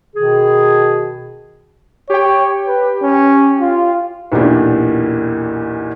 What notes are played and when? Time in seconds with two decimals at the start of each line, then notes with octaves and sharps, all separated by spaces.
0.15 B2 D#3 G#4
2.10 G4 C#5 G5
2.68 B4
3.02 C#4
3.61 F4
4.32 B1 E2 A#2 D4 G4